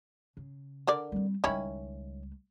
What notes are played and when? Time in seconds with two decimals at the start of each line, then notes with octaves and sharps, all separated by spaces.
0.37 C#3
0.87 D3 A#4 D5
1.12 G3 C4
1.44 C#2 D#3 G3 C#4 E4